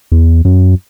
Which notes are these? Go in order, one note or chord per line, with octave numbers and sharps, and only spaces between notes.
E2
F#2